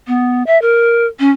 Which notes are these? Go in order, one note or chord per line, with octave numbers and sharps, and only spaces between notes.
B3
E5
A#4
C#4